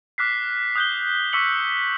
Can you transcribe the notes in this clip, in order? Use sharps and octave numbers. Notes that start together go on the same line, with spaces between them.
D6 F6 F#6 B6 C7
D#6 F#6 G6 C7 G7
C#6 D6 E6 B6 C#7 F#7